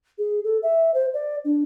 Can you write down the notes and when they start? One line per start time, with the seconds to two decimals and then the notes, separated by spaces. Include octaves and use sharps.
0.18 G#4
0.44 A4
0.63 E5
0.94 C5
1.14 D5
1.45 D4